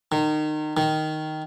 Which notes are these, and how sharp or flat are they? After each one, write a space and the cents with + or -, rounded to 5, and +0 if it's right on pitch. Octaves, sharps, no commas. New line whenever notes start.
D#3 -25
D#3 +0